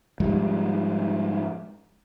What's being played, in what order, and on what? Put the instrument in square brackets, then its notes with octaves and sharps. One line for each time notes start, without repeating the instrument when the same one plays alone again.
[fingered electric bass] G#2 F3 G3 G#3